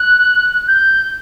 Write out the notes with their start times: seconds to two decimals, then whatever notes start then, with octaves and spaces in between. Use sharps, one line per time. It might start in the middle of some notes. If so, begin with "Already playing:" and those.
Already playing: F#6
0.68 G6